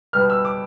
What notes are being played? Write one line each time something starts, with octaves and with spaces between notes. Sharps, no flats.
B2 G3 B3 F6
E6
D6